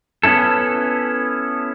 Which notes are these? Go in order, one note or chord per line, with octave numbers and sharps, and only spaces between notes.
B3 C#4 D4 E4 A4